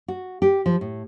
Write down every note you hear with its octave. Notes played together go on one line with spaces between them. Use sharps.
F#4
G4
F3
A2